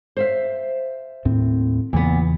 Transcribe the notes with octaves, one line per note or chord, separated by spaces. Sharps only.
C5 E5 F5
D#2 A2 C4
E2 A#2 C#3 E3 B3